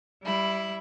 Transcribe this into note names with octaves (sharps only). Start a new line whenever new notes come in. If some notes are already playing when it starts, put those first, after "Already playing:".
G3 E4 B5